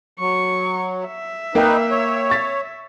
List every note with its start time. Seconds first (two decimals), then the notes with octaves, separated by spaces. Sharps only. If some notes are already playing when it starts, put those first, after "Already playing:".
0.19 F#3 C#6
1.07 E5
1.55 A#3 D#4 A#4 B4 G5
1.91 C#5
2.30 C#6 A6 B6